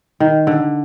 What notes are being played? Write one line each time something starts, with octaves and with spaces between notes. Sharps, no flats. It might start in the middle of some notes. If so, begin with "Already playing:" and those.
D#3
D3